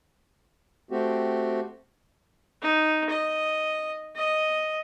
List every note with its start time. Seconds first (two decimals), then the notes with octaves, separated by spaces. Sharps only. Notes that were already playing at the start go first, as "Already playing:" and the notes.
0.91 A3 C4 F#4 G4
2.62 D#4
3.09 D#5
4.16 D#5